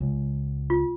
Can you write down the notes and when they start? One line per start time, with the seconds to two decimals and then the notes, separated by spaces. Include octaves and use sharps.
0.01 C#2
0.70 F4